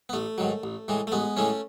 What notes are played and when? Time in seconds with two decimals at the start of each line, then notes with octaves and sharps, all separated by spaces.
0.09 B3
0.13 A1 A3
0.38 G#2 D#3 F#3
0.63 A1
0.88 A2 E3 G#3
1.07 A3
1.12 A1 G#3 B3
1.37 A2 E3 G#3 A3 C#4